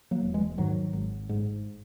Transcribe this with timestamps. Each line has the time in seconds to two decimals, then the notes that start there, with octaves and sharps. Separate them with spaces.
0.11 F#3 A#3
0.23 E1
0.34 E3 G#3
0.57 G#2 D#3 F#3
0.93 G#1
1.29 G#2